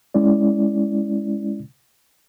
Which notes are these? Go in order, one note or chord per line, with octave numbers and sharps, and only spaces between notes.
G#3 C#4 E4 D5